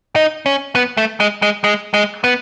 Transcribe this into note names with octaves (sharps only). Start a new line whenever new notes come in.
D#4
C#4
B3
A3
G#3
G#3
G#3
G#3
B3